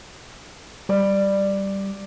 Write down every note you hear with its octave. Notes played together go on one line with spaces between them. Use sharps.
G3 D5